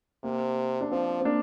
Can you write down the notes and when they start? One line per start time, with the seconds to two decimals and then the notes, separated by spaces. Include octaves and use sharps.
0.24 C3 A#3
0.81 D4
0.91 F3 C4
1.20 C4
1.25 A#3 D4